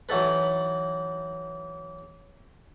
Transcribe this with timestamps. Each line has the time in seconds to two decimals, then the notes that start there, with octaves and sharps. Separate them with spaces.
0.09 E3 F#3 D#4 A4 B4